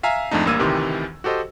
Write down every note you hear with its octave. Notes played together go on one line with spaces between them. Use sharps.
E5 F5 G#5 A#5
F2 G#2 A3 D4 D#4
A1 G2 A#3 E6 G#6 D#7
D2 C3 D#3 E3 G4 C6
F#4 G4 A4 C5 D#5